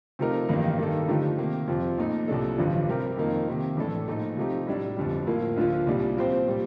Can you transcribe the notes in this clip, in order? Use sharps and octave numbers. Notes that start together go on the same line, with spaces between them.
C3 F3 A3 D#4 A#4
A1 G2 D#3 A#3 D#4
G2 D#3 A#3 D#4 A4
D3 F3 A3 D#4 G4
C3 D#3 A#3
F2 C3 F3
A#1 A#2 A3 D#4
C2 A#2 G3 D4 A4
A1 G2 D3 F3
C3 G3 C4 G4 A#4
F2 D#3 A#3 D#4
C3 D#3 A#3
A1 A2 A3 D4 A4
A#1 A#2 A3 D#4
C3 F3 A3 D#4 G4
A2 G3 D4
G1 F2 D3 G3
A2 F3 A#3
D2 D3 F3 A#3 F4
C2 A#2 G3 D4
A#2 F3 C4 G4 C5
A#2 G3